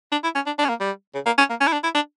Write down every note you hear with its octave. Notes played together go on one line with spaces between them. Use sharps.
D4
E4
C#4
D4
D4
C#4
A#3
G3
C#3
A#3
C#4
A#3
C#4
E4
D4
E4
D4